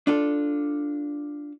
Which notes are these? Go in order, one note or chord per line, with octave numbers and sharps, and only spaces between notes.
D4 F4 A4